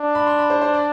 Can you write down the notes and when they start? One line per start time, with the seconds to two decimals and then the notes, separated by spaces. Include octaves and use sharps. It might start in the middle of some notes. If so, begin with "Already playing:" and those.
Already playing: D4
0.15 B5
0.27 C6
0.39 B5
0.50 C5
0.62 C5
0.74 D5